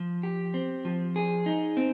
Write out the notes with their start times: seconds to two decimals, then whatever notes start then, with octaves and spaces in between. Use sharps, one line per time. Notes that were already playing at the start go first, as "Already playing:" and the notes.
Already playing: F3
0.23 G4
0.54 C4
0.85 F3
1.16 G#4
1.46 D#4
1.77 C4